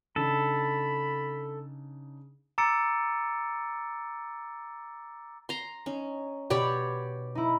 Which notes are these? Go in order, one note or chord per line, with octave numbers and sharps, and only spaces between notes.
C#3 D4 D#4 A4 B5
A#5 D6 E6 A6 C#7 D7
A#5 C6
C#4 D#4
B2 G4 C#5 D5
D#4 E4